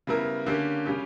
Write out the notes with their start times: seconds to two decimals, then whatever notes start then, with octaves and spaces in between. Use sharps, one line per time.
0.07 C#3 G3 B3 E4 A#4
0.46 D3 A#3 C#4 G4
0.85 C#3 G3 C#4 G4